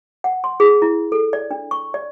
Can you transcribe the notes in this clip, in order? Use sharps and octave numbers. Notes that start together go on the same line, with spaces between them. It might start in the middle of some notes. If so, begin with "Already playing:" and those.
F#5
C6
G#4
E4
A4
D5
D4
C#6
D5